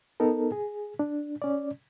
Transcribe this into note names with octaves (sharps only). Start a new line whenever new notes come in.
B3 D#4 A4 A#4
G#4
D4
C#4 D5